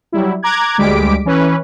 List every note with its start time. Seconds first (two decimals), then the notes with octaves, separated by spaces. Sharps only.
0.12 F#3 G3 E4
0.43 A#5 D6 F#6 G#6
0.78 D2 G3 G#3 D6 B6 D7
1.25 E3 C#4 B4